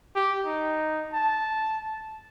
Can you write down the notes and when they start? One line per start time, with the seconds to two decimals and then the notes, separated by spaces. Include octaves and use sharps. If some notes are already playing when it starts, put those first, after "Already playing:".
0.15 G4
0.46 D#4
1.13 A5